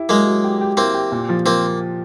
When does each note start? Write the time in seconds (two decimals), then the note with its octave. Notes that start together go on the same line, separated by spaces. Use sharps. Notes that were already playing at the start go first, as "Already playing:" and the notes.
Already playing: E4 G4
0.09 F#3 G#3 A#3
0.26 F#3
0.44 G4
0.61 G4
0.77 A#3 C4 E4
0.94 G4
1.12 A#2
1.29 F3
1.46 F3 A#3 C4